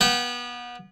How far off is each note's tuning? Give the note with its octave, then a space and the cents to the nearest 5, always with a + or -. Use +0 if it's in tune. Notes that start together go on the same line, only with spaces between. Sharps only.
B3 -30 G5 -35